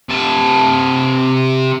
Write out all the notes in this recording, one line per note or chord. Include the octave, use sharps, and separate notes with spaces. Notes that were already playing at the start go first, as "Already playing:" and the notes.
C3 A5